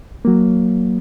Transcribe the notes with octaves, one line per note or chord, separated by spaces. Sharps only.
F#3 A#3